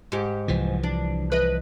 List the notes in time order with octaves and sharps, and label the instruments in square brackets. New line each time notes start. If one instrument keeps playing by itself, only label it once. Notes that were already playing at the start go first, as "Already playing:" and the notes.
[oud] G#2 G4
[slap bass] C2 E3 F3
[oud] D4
B4 D#5